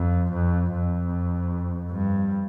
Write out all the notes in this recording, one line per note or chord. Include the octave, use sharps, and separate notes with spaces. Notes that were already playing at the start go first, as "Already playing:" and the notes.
Already playing: F2
F2
F2
G2